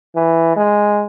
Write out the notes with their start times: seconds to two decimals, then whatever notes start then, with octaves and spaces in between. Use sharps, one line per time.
0.16 E3
0.56 G#3